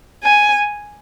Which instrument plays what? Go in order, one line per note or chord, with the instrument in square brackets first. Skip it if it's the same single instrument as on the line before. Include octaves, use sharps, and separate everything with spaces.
[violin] G#5